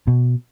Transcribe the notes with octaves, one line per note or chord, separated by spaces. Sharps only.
B2